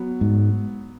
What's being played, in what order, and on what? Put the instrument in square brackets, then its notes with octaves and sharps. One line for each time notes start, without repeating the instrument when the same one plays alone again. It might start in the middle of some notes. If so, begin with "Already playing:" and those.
Already playing: [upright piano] F#3 B3
[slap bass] G#2